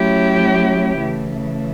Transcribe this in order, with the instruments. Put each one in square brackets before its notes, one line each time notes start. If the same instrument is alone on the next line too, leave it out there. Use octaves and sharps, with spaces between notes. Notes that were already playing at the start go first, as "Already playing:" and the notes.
Already playing: [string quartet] F#3 A3 C#4 E4 G4
C#3 E3 A3